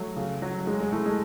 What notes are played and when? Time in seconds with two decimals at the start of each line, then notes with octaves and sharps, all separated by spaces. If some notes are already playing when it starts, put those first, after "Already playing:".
Already playing: F#3 A3
0.16 C#3
0.42 F#3
0.66 F#3 G#3
0.80 G#3
0.92 A2 A3
1.06 G#3